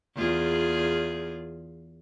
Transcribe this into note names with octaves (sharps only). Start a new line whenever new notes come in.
E2 F4 G#4